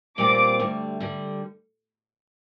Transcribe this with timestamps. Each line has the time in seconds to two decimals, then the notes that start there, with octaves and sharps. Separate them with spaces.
0.18 A#2 G3 C4 F4 D6
0.59 D2 D3 G3
1.00 D3 G3